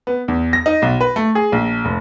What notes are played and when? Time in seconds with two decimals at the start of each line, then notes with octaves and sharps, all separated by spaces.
0.07 B3
0.28 E2
0.53 A#6
0.66 D#4
0.82 B1
1.01 B4
1.16 A3
1.35 G#4
1.52 A#1
1.85 F1